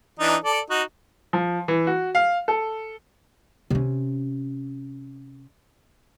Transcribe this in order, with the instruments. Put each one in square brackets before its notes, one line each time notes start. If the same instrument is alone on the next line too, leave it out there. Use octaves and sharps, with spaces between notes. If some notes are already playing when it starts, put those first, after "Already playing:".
[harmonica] E3 D4 D#4
A4 D5
D#4 F#4
[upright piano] F3
E3
F#4
F5
A4
[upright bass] C3 C#4